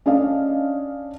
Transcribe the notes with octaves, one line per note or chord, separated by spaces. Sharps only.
C#4 D4 D5 D#5 F5